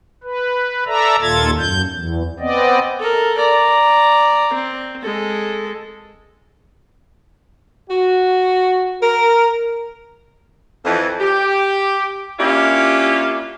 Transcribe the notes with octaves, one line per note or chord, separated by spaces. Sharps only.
B4
A4 D5 E5 A#5
D#2 A#2 F4 A4 G#6 A6
F#2 G6
E2
B3 C4 D5 D#5
A4 A#4
D5 A#5
C4
G#3 A4
F#4
A#4
F2 E3
G4
A#3 C#4 D4 E4 F4 G4